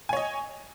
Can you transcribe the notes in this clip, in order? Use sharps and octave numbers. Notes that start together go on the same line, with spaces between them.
C#5 D#5 G#5